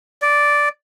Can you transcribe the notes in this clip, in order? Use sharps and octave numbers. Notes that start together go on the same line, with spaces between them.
D5